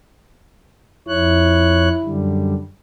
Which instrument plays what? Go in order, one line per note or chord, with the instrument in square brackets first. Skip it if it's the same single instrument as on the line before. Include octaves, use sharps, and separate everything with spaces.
[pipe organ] F2 C#5 F#6 [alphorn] E4
[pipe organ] F#2 D3 G3